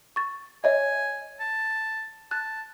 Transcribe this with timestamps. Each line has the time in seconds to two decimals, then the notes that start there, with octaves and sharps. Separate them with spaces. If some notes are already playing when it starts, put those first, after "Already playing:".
0.16 C#6 A6
0.64 C#5 D#5 E5 G#5
1.40 A5
2.31 A5 F#6